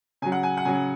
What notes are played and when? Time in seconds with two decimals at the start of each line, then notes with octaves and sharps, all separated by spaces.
0.22 C#3 G#5
0.26 F#3
0.32 F#5
0.43 G#5
0.57 F#5
0.65 C#3 F#3 G#5